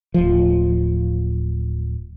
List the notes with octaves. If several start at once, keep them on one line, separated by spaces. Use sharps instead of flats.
D1 F3